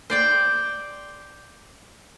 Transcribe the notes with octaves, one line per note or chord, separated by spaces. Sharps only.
C5 D5 G5